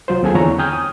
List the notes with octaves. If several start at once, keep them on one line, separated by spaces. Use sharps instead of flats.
C2 F#3 F4 C5
D#2 C4 F4 G#4 A4 G#5
E2 D3 E4 C#5 A#5
G5 G#5 D#6 F6 G6 G#6
D#6